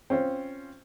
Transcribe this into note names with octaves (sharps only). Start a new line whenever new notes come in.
C4 C#4 F4 C5